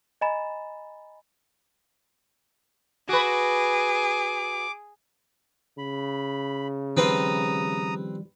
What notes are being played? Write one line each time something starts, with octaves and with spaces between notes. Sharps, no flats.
D#5 G#5 A#5 B5 A6 E7
F#4 G#4 B4 D6
C#3 B5
D#3 F3 G3 C4 B4 C5 A#5 D#6